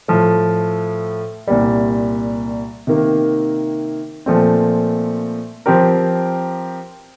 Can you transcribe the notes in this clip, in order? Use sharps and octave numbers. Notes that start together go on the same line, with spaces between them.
A2 F3 A3
C2 A#2 G3
C3 D#3 A#3
A#2 F3 A3 C4
F3 C4 G4 A#4